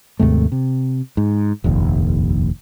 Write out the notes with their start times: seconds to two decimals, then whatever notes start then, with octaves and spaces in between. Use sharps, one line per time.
0.19 D#2 G#2 C3 A3
0.52 C3
1.17 G#2
1.64 F1 A#1 D#2